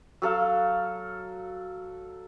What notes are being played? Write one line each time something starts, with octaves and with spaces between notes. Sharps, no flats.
F#3 A4 F5